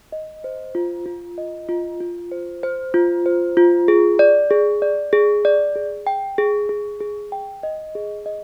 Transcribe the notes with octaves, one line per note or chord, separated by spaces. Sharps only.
D#5
C5
F4
F4
D#5
F4
F4
C5
C5
F4
C5
F4
G#4
D5
G#4
D5
G#4
D5
G#4
G5
G#4
G#4
G#4
G5
D#5
G#4
D#5